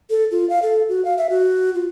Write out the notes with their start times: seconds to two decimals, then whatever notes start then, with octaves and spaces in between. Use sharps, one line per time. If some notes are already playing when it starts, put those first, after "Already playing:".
0.10 A4
0.31 F4
0.50 F5
0.63 A4
0.89 F#4
1.05 F5
1.18 E5
1.30 F#4
1.74 F4